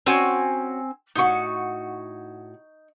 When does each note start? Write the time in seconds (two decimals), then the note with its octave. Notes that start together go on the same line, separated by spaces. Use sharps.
0.06 C4 C#4 F#4 G#5
1.15 A2 D#4 F#4 F#5 C#6